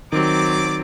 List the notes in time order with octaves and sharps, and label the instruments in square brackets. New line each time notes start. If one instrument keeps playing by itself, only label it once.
[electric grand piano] D#3 [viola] F#3 C4 [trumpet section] D5 D6